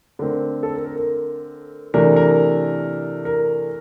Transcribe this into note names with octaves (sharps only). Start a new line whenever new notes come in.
D3 A3 C4 A#4
A4
A#4
A#4
A#4
C3 E3 A3 D4 A#4
A#4
A#4